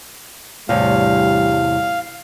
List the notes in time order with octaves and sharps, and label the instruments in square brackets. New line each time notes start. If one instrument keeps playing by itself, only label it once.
[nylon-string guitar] E2 A2 C3 [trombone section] G3 D4 [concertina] F5